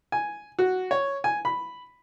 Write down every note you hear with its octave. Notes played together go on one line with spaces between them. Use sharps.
G#5
F#4
C#5
G#5
B5